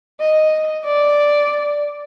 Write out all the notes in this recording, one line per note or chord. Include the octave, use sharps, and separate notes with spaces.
D#5
D5